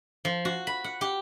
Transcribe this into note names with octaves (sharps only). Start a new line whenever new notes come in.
F3
F#4
B5
F#5
G4